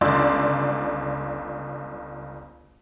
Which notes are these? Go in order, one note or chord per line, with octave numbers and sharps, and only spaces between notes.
G1 C#2 D5 C6 E6